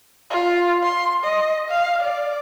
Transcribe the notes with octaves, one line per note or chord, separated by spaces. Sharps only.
F4
C6
D#5
F5
D5